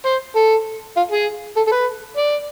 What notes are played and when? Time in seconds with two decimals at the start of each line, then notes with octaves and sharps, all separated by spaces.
0.06 C5
0.36 A4
0.97 F4
1.12 G#4
1.57 A4
1.67 A4
1.72 B4
2.17 D5